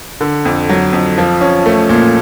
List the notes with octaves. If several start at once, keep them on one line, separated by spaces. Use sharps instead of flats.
D3
F2
F#3
F2
F3
C#4
A3
A#2